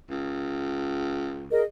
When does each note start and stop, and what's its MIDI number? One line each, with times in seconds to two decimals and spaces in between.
0.10 1.59 37
1.52 1.62 68
1.52 1.62 70
1.52 1.62 75